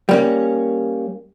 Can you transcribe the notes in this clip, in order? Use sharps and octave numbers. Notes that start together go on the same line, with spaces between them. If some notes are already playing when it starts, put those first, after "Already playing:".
G3 A#3 C#4